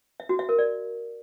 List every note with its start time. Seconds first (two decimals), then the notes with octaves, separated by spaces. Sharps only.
0.20 E5
0.29 F#4
0.39 E5
0.49 A#4
0.59 D5